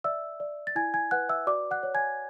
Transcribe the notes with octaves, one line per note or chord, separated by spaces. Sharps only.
D5 E5 E6
D5
A6
E4 G#5 G#6
G#5 G#6
B4 F#5 F#6
E5 E6
F#4 D5 D6
F#5 F#6
C#5
G#5 G#6